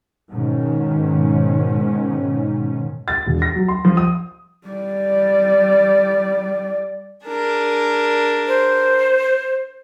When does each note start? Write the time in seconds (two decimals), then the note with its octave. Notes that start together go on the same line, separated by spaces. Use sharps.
0.32 G#2 B2 D#3 C#4
3.08 A6
3.27 E1
3.42 A#6
3.55 F#3
3.68 C6
3.85 F3
3.97 D#6
4.67 G3 D5
7.27 D4 G#4 A#4
8.48 C5